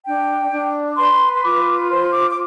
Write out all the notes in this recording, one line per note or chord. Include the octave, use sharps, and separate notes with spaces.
D4 G5
D4
B4 C6
C6
F4 D6
C5 C6
D6
D6